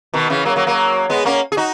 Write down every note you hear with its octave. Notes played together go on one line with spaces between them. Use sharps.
B2 D#3
C#3 E3
F#3 A#3
F#3 A#3
F#3 A#3
G#3 B3
A#3 C#4
G#4
D#4 F#4